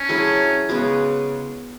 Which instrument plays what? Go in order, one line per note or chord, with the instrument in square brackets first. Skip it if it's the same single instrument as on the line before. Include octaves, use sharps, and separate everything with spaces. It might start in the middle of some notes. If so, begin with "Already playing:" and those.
Already playing: [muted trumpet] C#4 [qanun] D4
[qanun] F#3 A3 E4 G#4
C#3 G#3 B3 F#4